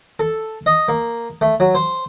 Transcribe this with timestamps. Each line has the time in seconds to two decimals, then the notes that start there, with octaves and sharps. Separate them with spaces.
0.20 A4
0.66 D#5
0.88 A#3
1.41 A3
1.60 F#3
1.75 C5